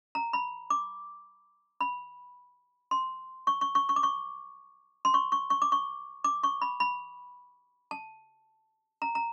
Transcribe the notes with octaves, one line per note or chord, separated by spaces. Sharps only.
A#5
B5
D6
B5
C6
C#6
C#6
C#6
C#6
D6
C#6
C6
C#6
C#6
C#6
D6
C#6
D6
C#6
B5
B5
A5
A#5
A#5